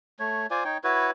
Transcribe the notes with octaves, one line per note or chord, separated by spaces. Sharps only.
A3 C#5
F4 C5 D5 G#5
D#4 C#5 G5
E4 F#4 B4 C#5